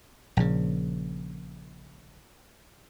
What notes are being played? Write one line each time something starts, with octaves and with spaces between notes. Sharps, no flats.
A#1 C#3